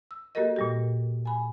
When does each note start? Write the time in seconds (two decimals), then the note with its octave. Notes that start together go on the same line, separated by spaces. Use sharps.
0.11 E6
0.35 A#3 F#4 G4 A4 A#4 D#5
0.56 A#2 G3 G4
1.26 G#5 B5